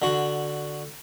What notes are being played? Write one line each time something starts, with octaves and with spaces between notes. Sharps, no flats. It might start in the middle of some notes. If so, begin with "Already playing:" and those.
D3 F#4